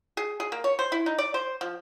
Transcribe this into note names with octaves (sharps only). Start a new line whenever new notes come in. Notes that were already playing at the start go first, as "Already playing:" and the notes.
G#4
G#4
A#3
C#5
C5
E4
D#4
D5
C5
F3